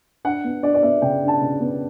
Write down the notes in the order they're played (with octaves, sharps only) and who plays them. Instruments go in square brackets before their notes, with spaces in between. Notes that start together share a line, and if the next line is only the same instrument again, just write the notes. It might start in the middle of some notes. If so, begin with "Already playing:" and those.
[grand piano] D4 F#5
B3
D4 D5
D5
B3 E5
C#3 G5
D4
A5
C#3
B3